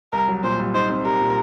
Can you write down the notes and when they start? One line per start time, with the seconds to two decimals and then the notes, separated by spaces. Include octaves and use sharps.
0.12 C2 A#4
0.28 F#3
0.44 A#2 C5
0.59 C2
0.74 D#4 C5
0.90 C4
1.05 G3 A#4
1.21 A#2